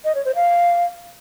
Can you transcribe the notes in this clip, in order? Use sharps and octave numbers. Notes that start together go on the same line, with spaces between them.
D#5
C#5
C5
F5